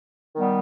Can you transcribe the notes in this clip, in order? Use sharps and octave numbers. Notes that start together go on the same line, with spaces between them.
D#3 G3 B3